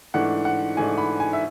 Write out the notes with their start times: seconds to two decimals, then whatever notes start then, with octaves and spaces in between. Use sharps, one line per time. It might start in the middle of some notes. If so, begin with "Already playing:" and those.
0.14 G#2 E3 A3 D4 F#5
0.45 F#5
0.77 G#2 E3 A3 D4 G#5
0.98 B5
1.20 G#5
1.33 E5